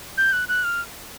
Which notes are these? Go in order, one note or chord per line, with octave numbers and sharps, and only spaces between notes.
G6
F#6
F#6
F6